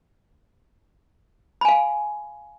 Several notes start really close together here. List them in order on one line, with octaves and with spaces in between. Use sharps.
B5 G#5 F5